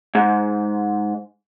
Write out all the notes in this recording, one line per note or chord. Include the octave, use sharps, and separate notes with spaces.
G#2